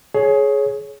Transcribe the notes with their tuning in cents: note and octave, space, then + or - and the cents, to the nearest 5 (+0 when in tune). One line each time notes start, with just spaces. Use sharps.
G#4 +20 C#5 +0